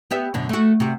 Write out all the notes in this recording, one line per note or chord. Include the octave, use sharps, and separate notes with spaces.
B3 G4 E5
F#2 B2 D3
A3 F#4
C3 F#4